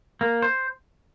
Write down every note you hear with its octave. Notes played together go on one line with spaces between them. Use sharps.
A#3
C5